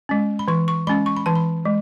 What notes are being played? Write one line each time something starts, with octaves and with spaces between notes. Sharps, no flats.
G#3 C#4
B5
E3 C#6
C#6
G#3 C#4 B5
C#6
B5
E3 A5
B5
G#3